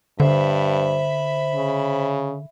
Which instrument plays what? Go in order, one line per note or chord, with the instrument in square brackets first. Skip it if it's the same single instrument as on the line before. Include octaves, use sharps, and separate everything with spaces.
[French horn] G2 [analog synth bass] D3 [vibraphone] C5 [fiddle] E5 B5
[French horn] C#3